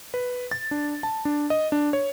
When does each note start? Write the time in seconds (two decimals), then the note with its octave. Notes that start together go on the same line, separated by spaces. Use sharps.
0.14 B4
0.51 A6
0.71 D4
1.03 A5
1.25 D4
1.50 D#5
1.72 D4
1.93 C#5